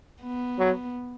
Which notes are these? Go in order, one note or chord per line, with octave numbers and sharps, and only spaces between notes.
B3
F#3